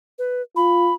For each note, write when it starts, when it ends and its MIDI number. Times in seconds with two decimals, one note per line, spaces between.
0.19 0.42 71
0.56 0.92 65
0.56 0.94 83